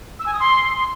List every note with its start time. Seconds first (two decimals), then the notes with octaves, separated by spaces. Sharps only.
0.19 E6
0.26 G#5
0.33 D#6
0.40 C6